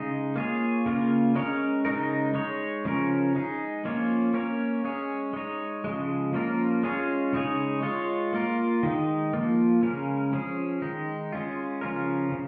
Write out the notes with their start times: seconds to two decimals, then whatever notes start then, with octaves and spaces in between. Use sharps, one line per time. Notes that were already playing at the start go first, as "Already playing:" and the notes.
Already playing: C#3 G#3 D#4 G#4
0.36 A#3 F4 G#4 C#5
0.86 C#3 A#3 F4
1.36 G#3 C#4 A#4 C#5
1.85 C#3 G#3 D#4 A#4
2.34 G#3 D#4 C#5
2.85 C#3 F3 C#4 A#4
3.35 G#3 D#4 G#4
3.85 F3 A#3 C#4 F4 C#5
4.34 A#3 C#4 A#4 C#5
4.84 G#3 C#4 G#4 C#5
5.33 G#3 D#4 C#5
5.84 C#3 F3 G#3
6.33 F3 A#3 C#4 F4 A#4
6.83 G#3 C#4 F4 G#4 C#5
7.33 C#3 G#3 D#4 G#4 C#5
7.83 G#3 F4 C#5
8.33 A#3 F4 A#4
8.83 D#3 G#3 D#4
9.33 F3 A#3 F4
9.82 C#3 G#3 C#4 A#4
10.33 F3 C#4 G#4
10.82 D#3 G#3 D#4
11.32 G#3 C#4 F4
11.81 C#3 F3 C#4 F4 A#4
12.32 C#3